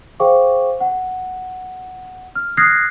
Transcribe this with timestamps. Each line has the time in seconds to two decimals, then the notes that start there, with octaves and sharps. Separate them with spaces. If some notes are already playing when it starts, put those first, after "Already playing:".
0.20 G#4 C5 F5 G5 C#6 D6
0.81 F#5
2.35 F6
2.57 D#6 F6 F#6 G#6 A#6 C7